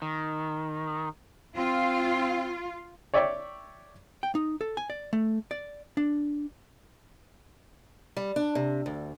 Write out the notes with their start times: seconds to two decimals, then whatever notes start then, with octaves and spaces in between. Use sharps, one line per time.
0.02 D#3
1.56 C4 F4
3.14 C#5 D5 E5 G5 C#6
4.23 G5
4.35 D#4
4.61 A4
4.77 G#5
4.90 D5
5.13 A3
5.51 D5
5.97 D4
8.17 G3
8.36 D4
8.55 C3
8.86 D2